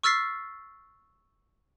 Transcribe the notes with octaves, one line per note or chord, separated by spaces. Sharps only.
C#6 E6 F6 A6 B6 C7